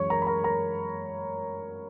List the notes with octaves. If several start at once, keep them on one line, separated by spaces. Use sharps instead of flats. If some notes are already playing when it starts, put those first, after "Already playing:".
Already playing: F#2 E3 G#3 C#5 C#6
A#4 A#5
B5
A#4 A#5
A#4 A#5